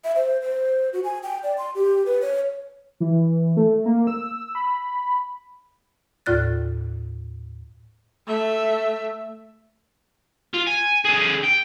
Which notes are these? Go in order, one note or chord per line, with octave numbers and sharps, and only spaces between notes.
E5
C5
C5
F#4
G#5
G5
D5
C6
G4
B4
C#5
E3
A3
A#3
E6
B5
D#2 A2 F4 D5 F#6 A6
A3 E5
F4
G#5
D3 G#4
G5